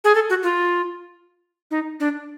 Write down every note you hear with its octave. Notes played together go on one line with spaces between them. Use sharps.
G#4
A4
F#4
F4
D#4
D4